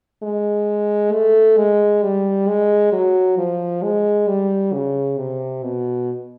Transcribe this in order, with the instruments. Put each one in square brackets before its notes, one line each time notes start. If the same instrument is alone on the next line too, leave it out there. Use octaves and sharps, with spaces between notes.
[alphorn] G#3
A3
G#3
G3
G#3
F#3
F3
G#3
G3
C#3
C3
B2